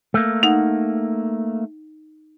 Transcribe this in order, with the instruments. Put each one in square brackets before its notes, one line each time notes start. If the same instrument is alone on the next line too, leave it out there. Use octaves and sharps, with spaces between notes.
[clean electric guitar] A3 A#3
[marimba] D#4 F#5